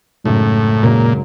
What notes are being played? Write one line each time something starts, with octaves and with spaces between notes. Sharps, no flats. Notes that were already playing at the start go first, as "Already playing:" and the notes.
G#1 F#2 A2 C#3 F#3
G#1 F#2 A#2 C#3 F#3